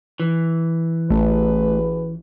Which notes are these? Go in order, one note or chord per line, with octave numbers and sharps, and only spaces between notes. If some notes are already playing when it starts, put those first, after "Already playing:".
E3
A1 A3 F#4 G#4 B4